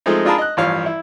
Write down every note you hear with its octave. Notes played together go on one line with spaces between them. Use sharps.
F3 G#3 A3 C4 D#4
D4 F4 G#4 A#4 A5 B5
D#5 F#6
A1 G2 F3 C#5 F5
E4